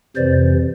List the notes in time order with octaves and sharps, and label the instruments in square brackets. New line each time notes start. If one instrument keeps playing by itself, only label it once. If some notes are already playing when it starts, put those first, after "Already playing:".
[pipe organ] F2 C3 E3 C5 D5